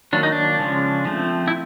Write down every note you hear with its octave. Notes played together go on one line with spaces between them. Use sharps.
D#3 F#3 A#3 D4
D#4
D4
C#3 F3 G#3 C#4
F3 A3 C4
E4